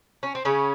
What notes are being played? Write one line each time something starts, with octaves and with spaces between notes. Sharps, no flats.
C#4
C4
C#3 C#4